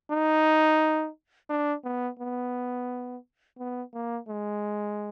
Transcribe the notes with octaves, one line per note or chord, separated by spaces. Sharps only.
D#4
D4
B3
B3
B3
A#3
G#3